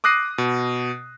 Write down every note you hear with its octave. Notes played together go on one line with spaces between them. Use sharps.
D6 D#6 F#6 A#6 C7 D#7
B2